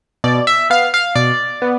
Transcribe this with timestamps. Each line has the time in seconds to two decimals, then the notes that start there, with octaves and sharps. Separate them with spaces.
0.24 B2 D5
0.47 E5
0.70 B3 F5
0.94 F5
1.15 B2 D5
1.62 B3